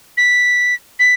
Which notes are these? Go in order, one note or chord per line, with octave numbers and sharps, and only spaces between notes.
B6
B6